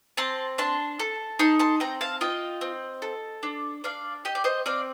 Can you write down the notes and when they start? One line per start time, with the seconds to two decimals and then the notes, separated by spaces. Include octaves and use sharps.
0.17 C4 A5 C6
0.58 D4 A5 C6
0.99 A4
1.39 D#4 A5 C6
1.59 A5 C6
1.80 C4 G5 A#5
2.01 F5 A5
2.21 F4 D#5 G5
2.61 C4
3.02 A4
3.43 D4
3.84 D4 D5 F5
4.25 G4 D#5
4.35 D5
4.44 C5 D#5
4.66 C4 D5 F5